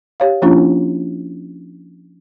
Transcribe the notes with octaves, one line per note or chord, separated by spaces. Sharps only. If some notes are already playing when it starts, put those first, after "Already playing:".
G4 C#5 F5
F3 A#3 C#4 D4 E4 F4